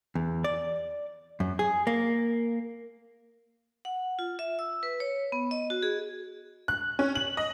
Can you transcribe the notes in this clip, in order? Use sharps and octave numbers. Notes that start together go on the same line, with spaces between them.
E2
D5
F#2
G#4
A#3
F#5
F4
E5
E6
B4
C#5
B3
D#5
F#4
G#4
F#6
C#4
F#7
D#5